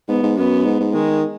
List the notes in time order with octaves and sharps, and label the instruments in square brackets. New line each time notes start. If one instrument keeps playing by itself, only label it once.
[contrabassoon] G#2 [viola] B3
[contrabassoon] G#2
[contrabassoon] F#2 [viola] B3
[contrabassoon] G#2
G#2
[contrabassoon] D#3 [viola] G#3